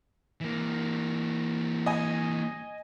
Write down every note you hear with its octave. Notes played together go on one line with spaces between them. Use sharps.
E3 A#3
D#5 G#5